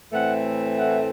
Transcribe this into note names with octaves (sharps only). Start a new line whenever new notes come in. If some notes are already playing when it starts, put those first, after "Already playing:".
A2 E3 A3 C4 F#5
F#5